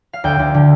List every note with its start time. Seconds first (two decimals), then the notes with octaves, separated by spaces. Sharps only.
0.13 F5
0.24 D2 G5
0.39 D2
0.54 D3